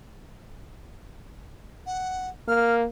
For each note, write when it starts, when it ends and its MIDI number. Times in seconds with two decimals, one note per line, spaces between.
1.86 2.29 78
2.48 2.86 58
2.48 2.74 89